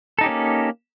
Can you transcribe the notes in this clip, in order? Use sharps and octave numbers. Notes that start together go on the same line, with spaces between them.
A#3 C#4 D#4 G4 A4